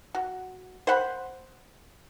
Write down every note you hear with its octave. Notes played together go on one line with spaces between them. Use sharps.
F#4
C5 F#5 B5